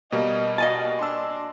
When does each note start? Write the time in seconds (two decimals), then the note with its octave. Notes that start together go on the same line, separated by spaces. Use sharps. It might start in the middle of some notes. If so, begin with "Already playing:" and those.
0.12 B2 G3 A#3 D#5
0.58 F#4 D#5 G#5 A5
0.99 D4 C6 E6